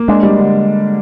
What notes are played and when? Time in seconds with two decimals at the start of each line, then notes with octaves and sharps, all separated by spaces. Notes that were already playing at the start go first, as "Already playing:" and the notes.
Already playing: A#3
0.08 G#3 D4
0.23 G3
0.37 D3